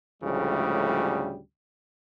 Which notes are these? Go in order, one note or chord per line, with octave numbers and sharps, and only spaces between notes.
D2 A2 C#3 F3 G3 G#3